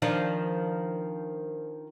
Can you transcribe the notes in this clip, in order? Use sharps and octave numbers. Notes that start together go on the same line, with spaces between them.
D#3 F3 D4